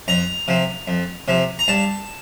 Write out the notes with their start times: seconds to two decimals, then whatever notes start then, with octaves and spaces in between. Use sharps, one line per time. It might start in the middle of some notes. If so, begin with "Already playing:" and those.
0.08 F2 A#5
0.48 C3 F3
0.88 F2
1.28 C3 F3
1.59 A#5
1.68 G2 A5